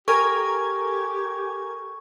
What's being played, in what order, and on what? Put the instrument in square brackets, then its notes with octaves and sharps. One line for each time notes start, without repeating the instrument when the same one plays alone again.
[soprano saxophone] G4 [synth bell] A4 [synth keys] A#4 G#5 G#6 [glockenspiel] C#6